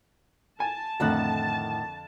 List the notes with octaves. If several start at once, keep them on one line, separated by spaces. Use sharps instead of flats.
G#5 A5
F2 A2 D3 D#3 F#5 F#6